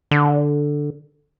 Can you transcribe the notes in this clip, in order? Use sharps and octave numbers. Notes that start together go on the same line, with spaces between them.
D3